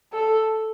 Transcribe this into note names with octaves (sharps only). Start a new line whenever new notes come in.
A4